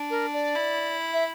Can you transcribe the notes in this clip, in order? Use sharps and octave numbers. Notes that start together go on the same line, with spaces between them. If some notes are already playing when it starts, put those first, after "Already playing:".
Already playing: D4
A#4
D5
E4
E5